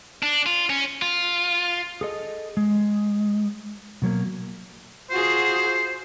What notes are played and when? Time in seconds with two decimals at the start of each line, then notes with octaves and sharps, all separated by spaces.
0.23 D4
0.46 F4
0.70 C#4
1.02 F4
2.01 G#4 A4 D#5
2.57 G#3
4.02 B2 F#3 A#3
5.11 F4 F#4 G#4 C5